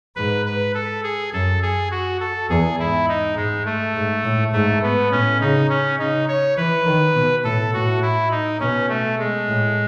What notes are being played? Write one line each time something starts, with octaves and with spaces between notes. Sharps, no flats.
G#2 B4
B4
A4
G#4
F#2 A4
G#4
F#4
A4
E2 G#4
G#2 E4
D#4
G#2 G#3
A3
G#2
A2
G#2 A3
B3
A2 C#4
C#3 D#4
C#4
C#3 D#4
C#5
E3 B4
D#3
B2
A2 A4
A2 F#4
E4
D#4
B2 C#4
A3
G#3
A2